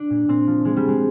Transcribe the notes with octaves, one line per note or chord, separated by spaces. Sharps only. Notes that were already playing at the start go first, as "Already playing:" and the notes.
Already playing: D4
A#2
A#2 C4
F3
F3 G#3
G3
F3 G#3